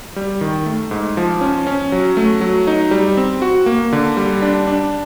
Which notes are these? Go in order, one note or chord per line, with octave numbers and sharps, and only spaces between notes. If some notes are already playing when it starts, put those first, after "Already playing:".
G3
D#3
A3
G#2
F3
C#4
C#4
F#3
A3
F#3
D#4
G3
C4
F#4
A#3
D3
G3
D4
D4